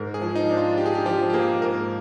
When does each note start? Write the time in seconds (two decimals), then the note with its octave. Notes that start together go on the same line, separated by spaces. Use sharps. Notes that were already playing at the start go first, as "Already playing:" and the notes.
Already playing: G#2 A#4
0.14 G#4
0.21 F3
0.36 D#4
0.50 D4
0.57 F4
0.77 D4 G4
0.86 G#4
0.95 G4
1.05 F3 G4
1.30 G4
1.33 A#3 G#4
1.62 G#2 A#4